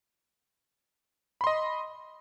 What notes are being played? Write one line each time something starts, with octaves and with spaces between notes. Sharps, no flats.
D#5 B5 C6